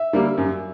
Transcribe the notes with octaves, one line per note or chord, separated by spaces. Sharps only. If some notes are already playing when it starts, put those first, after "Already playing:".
Already playing: E5
D3 G3 A#3
F#2